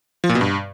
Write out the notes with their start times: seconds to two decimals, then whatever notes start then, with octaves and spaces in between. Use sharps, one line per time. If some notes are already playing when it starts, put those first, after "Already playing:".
0.24 F3
0.29 A#2
0.35 B2
0.41 G2